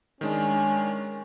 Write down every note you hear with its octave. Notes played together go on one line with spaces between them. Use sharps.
D#3 G#3 C#4 D4